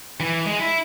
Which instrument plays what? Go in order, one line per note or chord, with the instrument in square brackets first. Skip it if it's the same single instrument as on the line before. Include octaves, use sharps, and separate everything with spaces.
[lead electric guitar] E3
G#3
E4